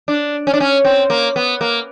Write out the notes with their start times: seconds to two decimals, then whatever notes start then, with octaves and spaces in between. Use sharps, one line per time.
0.08 D4
0.47 C#4
0.53 D4
0.60 C#4
0.85 C4
1.10 A#3
1.36 B3
1.61 A#3